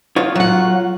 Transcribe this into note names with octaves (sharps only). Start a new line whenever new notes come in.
F4 C#5
F#3 F#5